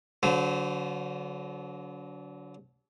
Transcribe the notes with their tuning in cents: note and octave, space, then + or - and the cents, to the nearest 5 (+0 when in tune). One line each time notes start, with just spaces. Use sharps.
D3 -35 F#3 +0 C5 -35